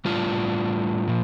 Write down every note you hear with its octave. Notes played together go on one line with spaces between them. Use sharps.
A2 G3 D4 F4
A#2 F3